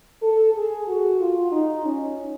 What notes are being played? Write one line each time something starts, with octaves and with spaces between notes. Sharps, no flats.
A4
G#4
F#4
F4
D#4
C#4